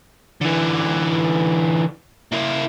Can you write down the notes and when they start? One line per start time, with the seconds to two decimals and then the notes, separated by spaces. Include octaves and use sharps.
0.41 D3 E3
2.32 A#3 E4